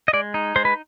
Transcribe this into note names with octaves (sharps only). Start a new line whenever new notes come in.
D#5
G#3 D5
D#4
G#3 C5
B4